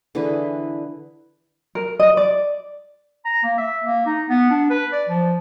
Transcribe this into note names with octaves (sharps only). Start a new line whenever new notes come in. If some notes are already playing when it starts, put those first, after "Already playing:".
D3 E3 G#4 B4
A#4
D#5
D5
A#5
A#3
E5
A#3
D#4
B3
D4
B4
D5
F3